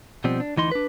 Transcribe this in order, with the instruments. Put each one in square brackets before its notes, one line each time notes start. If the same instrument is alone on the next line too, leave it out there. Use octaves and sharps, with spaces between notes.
[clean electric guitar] B2 F3 G3 C4
D4
D2 E3 D#4 C6
D4 B4